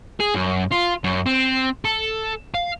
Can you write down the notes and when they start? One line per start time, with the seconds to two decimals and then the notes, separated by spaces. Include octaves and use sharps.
0.20 G#4
0.34 F#2
0.71 F4
1.04 F#2
1.26 C4
1.85 A4
2.54 F5